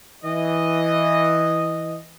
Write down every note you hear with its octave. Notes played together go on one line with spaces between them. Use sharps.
E3 D#5